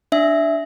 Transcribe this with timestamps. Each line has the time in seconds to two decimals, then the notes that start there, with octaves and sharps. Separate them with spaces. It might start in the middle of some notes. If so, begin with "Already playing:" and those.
0.12 D4 E5